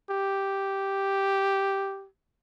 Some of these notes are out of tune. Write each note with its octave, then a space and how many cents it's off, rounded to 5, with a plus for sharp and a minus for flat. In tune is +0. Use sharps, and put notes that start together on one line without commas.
G4 -5